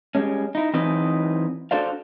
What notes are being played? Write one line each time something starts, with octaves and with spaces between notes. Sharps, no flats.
G3 G#3 C#4
D#4 E4
E3 F#3 C4 D#4 B4 D#5
D4 F#4 A4 C5 D5 F5